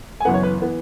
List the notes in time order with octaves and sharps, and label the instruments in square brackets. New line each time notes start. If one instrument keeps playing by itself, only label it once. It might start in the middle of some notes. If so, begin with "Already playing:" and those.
[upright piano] G#5
F#1 F#2 E3 B3 F#5
C#5
B4
E3 B3